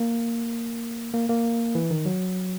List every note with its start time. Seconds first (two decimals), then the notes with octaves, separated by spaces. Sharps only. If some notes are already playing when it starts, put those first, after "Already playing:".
Already playing: A#3
1.14 A#3
1.29 A#3
1.75 E3
1.90 D#3
2.06 F#3